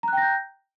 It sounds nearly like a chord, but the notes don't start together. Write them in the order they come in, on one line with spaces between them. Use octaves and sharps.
A#5 F#6 G5 A#6 G6